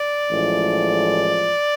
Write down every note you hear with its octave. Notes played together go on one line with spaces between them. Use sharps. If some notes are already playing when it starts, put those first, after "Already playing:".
Already playing: D5
A1 A2 F3 G#3